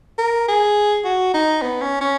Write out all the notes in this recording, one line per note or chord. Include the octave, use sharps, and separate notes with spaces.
A#4
G#4
F#4
D#4
B3
C#4
C#4